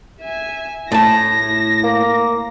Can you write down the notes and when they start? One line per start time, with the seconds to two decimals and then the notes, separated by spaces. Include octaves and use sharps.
0.22 E5 G#5
0.92 A2 E4 A5 A#6
1.84 A#3